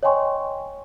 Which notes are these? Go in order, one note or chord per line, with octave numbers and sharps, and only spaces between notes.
C#5 D#5 G5 G#5 C6 C#6